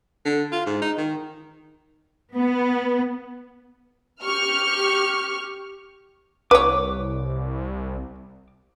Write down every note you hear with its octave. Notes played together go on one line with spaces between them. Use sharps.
D3
F4
G#2
D#4
D#3
B3
G4 C#6 F6
C2 B4 C#5 D6